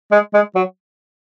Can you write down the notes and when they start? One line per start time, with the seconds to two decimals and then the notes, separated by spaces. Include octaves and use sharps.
0.12 G#3
0.34 G#3
0.55 F#3